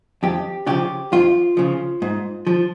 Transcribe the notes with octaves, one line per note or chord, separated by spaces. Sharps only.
F2 G4
C#3 F3 G4
F2 F4
C#3 F3
G#2
F3